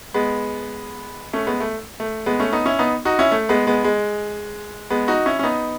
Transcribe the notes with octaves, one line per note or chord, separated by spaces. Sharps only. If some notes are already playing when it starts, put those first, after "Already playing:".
G#3 B3
A3 C#4
G#3 B3
A3
A3
G#3 B3
A3 C#4
B3 D#4
C#4 E4
B3 D#4
D#4 F#4
C#4 E4
A3
G#3 B3
G#3 B3
G#3
G#3 B3
D#4 F#4
C#4 E4
C#4
B3 D#4